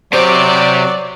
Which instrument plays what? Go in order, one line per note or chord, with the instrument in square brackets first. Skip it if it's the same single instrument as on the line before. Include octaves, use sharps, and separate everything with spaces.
[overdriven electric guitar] C3 G4 [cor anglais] F#3 [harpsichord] C5 [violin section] D5